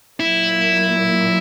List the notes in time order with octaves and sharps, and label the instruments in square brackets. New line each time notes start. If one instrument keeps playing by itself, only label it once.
[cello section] A#2 F#3 A#3 [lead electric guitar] E4